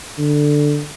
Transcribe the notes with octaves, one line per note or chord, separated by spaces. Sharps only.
D3